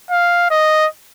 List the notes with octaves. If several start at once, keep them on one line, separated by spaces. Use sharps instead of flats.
F5
D#5